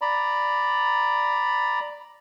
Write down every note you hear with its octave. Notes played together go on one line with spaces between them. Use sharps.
D5 A#5 B5